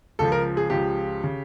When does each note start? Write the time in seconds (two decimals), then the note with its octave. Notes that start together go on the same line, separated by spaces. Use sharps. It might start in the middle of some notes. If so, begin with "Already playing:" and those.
0.19 C#2 C#3 F3 A4
0.32 A#4
0.57 G#4
0.70 C#2 C#3 F3 G4
1.24 C#3